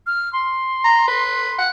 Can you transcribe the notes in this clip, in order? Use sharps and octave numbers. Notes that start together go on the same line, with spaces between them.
F6
C6
A#5
B4
F#5